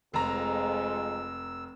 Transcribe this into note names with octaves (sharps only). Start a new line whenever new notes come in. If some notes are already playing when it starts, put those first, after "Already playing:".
F1 F2 G#3 A#5 E6